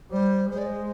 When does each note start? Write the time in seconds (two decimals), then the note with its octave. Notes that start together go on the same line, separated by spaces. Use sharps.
0.11 G3 C5
0.50 G#3 C5
0.58 D5
0.66 C5